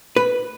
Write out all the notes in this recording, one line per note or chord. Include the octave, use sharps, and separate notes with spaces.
B4